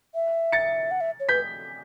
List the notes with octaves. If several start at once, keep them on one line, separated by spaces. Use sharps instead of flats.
E5
A6 C#7
F#5
E5
C#5
B4 G6 B6